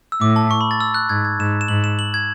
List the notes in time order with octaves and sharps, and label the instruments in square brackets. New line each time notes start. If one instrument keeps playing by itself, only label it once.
[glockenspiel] E6
[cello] A2 [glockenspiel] D6
[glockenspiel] A5
C#6
B5
A6
E6
F#6
[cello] G#2 [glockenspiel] G#6
[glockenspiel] G#6
[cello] G#2 [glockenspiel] E7
[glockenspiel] E7
[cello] G#2 [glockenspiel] F#7
[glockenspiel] E7
F#7
G#6